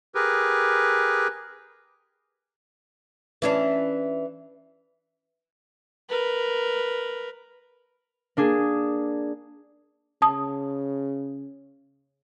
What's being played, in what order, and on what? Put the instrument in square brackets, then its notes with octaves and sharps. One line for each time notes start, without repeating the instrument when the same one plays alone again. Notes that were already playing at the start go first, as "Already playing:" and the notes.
[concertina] G4 G#4 A#4 B4
[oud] E3 C#4 D4
[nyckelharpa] A#4 B4
[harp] A#3 D4 G#4
[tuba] C#3 [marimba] A5 D#6